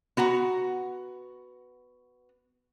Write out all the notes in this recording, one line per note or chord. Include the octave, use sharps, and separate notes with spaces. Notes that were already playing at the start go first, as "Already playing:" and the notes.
B3 F#4 F#5 A#5